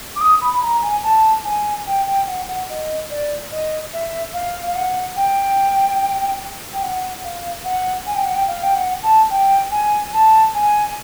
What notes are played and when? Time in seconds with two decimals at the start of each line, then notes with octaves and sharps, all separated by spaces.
0.16 D6
0.21 D#6
0.41 B5
0.52 B5
0.62 A#5
0.82 G#5
1.03 A5
1.44 G#5
1.87 G5
2.07 G5
2.27 F#5
2.48 F#5
2.70 D#5
3.10 D5
3.52 D#5
3.94 E5
4.34 F5
4.67 F5
4.75 F#5
5.16 G5
6.73 G5
6.83 F#5
7.24 F5
7.64 F#5
8.06 G#5
8.15 G5
8.25 F#5
8.35 G5
8.47 F5
8.63 G5
8.75 F#5
9.03 A5
9.30 G5
9.71 G#5
10.13 A5
10.54 G#5